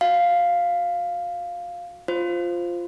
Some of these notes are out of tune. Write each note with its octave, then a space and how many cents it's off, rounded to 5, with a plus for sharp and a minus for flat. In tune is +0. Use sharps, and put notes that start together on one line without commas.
F#4 -25 F5 +0
F4 +0 C5 +0